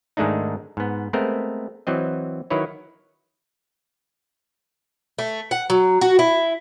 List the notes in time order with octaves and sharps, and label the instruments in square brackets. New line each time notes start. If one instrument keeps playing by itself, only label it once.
[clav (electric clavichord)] G#2 D#3 G#3 A3 D4 D#4
G#2 B3
G#3 A3 B3 C4 A#4
E3 F#3 C4 D#5
D#3 F#3 E4 B4 C#5
[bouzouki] A3
F#5
F#3
F#4
E4